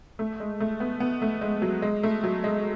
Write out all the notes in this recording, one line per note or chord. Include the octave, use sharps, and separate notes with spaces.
A3
G#3
A3
B3
B3
A3
G#3
F#3
G#3
A3
F#3
G#3